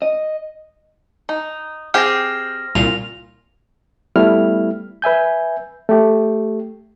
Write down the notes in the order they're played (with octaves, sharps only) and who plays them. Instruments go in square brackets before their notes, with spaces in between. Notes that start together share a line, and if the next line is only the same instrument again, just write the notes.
[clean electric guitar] D#5
[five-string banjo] D#4
[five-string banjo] C4 G4 G#4 [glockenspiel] F6 A#6 [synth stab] C7
[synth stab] C2 A#2 [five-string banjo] F4 [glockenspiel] F7
[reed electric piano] G3 A3 B3 E4 F6
B4 E5 G#5 G6
A3 G4